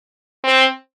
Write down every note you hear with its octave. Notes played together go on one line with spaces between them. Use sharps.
C4